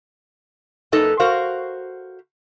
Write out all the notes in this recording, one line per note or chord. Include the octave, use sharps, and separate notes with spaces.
F#2 A#3 D#4 A4 B4
F#4 A#4 C5 F5